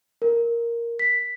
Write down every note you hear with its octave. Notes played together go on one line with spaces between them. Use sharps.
A#4
B6